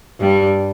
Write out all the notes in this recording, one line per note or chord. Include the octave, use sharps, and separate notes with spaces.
G2 G3